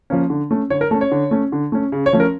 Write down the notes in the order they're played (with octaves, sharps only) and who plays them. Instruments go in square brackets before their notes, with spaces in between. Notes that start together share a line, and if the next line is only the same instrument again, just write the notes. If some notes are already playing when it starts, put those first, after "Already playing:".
[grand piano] F3 A#3 C#4
D3
A3 C#4
D3 C#5
A#4
A3 C#4 A4
C#5
D3
A3 C#4
D3
A3 C#4
C#3
C#5
F3 A3 C#4
A#4